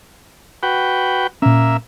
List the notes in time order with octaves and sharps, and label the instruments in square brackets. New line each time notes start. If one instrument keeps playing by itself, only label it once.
[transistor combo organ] F#4 B4 G5
[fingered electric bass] A#2 C#4 [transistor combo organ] A#3 E5